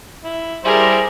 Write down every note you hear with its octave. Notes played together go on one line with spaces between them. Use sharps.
E4
G3 E4 G#4 A#4 C5